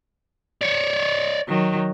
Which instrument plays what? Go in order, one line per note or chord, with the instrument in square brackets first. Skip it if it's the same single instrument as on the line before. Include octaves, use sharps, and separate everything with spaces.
[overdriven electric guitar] C#5 D5
[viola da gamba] D#3 F#3